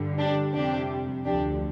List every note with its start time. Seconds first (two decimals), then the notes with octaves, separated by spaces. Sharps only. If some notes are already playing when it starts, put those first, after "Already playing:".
Already playing: G2 D3 G3
0.18 D4 G4
0.53 F2 C3 G3 D4 G4
1.25 D2 D3 F3 D4 G4